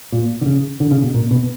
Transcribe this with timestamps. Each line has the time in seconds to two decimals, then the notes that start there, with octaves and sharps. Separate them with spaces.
0.12 A#2
0.41 D3
0.46 C#3
0.80 D3
0.91 C#3
1.02 B2
1.14 A#2
1.31 B2